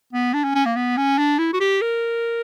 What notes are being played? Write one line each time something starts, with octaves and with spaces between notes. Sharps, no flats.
B3
D4
C#4
C#4
A#3
B3
C#4
D4
E4
F#4
G4
A#4